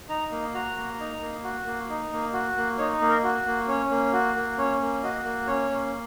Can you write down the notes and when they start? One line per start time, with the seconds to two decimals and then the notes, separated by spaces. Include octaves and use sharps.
0.09 D#4 A#5
0.32 A#3
0.54 F#4 A#5
0.77 A#3
1.00 D#4
1.21 A#3
1.44 F#4
1.66 A#3
1.90 D#4
2.12 A#3
2.33 F#4
2.57 A#3
2.78 D#4 C#5
3.01 A#3
3.09 A#4
3.24 F#4
3.46 A#3
3.68 C#4 C#5
3.90 A#3
4.13 F#4
4.36 A#3
4.58 C#4 C#5
4.81 A#3
5.03 F#4 D#5
5.25 A#3
5.47 C#4 C#5
5.71 A#3